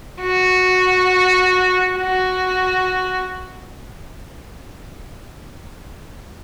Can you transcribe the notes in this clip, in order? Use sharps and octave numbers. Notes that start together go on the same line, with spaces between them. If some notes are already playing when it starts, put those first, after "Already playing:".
F#4
F#4